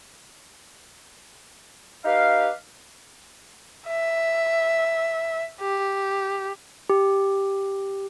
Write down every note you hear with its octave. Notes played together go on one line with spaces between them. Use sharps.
D#4 G4 B4 F5
E5
G4
G4